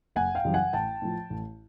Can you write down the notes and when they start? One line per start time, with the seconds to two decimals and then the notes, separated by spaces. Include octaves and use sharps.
0.16 F#1 F#5 G#5
0.35 F5 G5
0.45 F#2 C#3 E3 G3
0.54 F#5 G#5
0.73 A1 G5 A5
1.02 A2 F3
1.30 A1